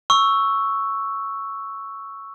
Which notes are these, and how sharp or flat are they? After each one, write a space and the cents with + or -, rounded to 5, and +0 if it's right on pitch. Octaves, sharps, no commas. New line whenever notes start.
C#6 +0 E6 +0